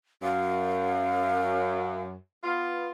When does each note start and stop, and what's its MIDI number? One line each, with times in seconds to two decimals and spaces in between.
0.23 2.14 42
0.23 2.02 77
2.44 2.90 59
2.44 2.90 65